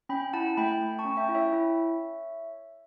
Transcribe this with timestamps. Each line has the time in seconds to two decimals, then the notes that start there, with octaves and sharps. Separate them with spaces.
0.09 C#4 G5 B5
0.33 E4 F#5 A5
0.57 A3 G5 B5
0.82 A3
0.99 A5 C#6
1.05 C#4
1.17 E5 G5
1.29 E4
1.35 C#5 E5
1.53 E4